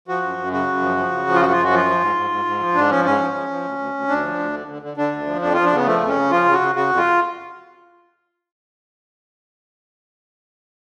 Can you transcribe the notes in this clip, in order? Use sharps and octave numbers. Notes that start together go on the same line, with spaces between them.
F3 F#4
F#2
F#2
C#3 F#4
F#2
F3
F3
C#3
F3
F4
F#2 F#4
F#2 F4
F#4
F3 F4
F3
G#2
G#2
G#2
G#2
F3
G#2 D4
F3 C#4
G#2 C#4
F3
F3
F3
D2
D2
D2
D2 D4
F3
D2
D3
D3
D3
D3 D4
D2
F3
F2 D4
F3 F4
D4
C#3 B3
F3 A3
F2
C#4
C#3
F3 F4
C#3
F#4
C#3
C#3 F#4
F2
F4